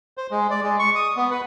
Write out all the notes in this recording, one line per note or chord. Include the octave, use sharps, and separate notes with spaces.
C5
G#3
D5
G#3
C#6
D#6
B3
B4